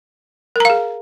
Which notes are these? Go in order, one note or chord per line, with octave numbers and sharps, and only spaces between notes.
G#4 A#4 F5 A#5